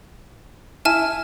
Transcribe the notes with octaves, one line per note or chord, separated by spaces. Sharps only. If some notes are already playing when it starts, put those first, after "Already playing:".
E4 G#5 A5 F6